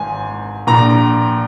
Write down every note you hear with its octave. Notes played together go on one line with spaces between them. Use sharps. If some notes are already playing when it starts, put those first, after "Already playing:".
Already playing: G#1 G#2 G#5
A#1 A#2 A#5